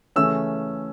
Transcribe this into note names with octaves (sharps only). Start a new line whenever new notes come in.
C#3 E3 A3 C#4 E6